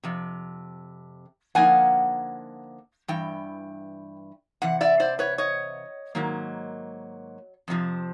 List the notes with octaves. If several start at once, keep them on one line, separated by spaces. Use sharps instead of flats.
F2 C3
D3 F3 A#3 D#4 F#5 G#5
G2 E3 G5
C3 E3 F#5
D5 E5
C5 D5
B4 C#5
C#5 D#5
G#2 D#3 F#3 A#3
F2 C3 F3